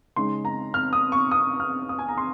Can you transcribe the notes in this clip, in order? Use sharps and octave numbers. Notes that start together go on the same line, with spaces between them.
C#3 G#3 D#4 C6
A#5
F6
D#6
C#6
D#6
F6
D#6
G#5
A#5
C6